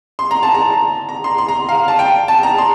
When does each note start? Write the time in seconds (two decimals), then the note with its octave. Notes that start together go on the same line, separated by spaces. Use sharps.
0.19 C6
0.31 A#5
0.43 A5
0.54 A#5
1.09 A#5
1.24 C6
1.38 C6
1.48 A#5
1.69 F5
1.88 A5
1.99 G5
2.28 A5
2.43 A#5
2.58 C6